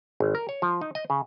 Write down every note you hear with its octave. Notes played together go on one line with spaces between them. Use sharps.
G#1
A#4
C#5
F3
D#4
D#5
C#3